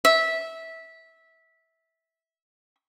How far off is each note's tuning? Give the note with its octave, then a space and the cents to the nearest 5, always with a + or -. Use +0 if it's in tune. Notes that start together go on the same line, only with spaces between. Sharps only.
E5 -15